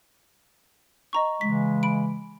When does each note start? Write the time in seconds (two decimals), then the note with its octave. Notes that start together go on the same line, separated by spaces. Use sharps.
1.13 D#5 A#5 C#6
1.41 C#3 E3 G#3 B6
1.83 B5 D7